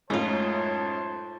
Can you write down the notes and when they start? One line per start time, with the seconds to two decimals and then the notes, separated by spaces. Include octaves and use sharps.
0.10 F#2 A2 G#3 D#4 F4 C5 C#5 A5